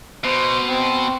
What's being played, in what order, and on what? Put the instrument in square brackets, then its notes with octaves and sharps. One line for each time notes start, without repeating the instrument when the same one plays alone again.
[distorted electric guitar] B2 [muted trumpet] C5
[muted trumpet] C4